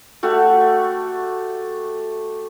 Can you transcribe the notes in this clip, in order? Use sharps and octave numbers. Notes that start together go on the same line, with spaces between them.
A3 F#4 G4